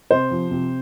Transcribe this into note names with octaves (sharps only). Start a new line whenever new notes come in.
C3 C5
F3
C3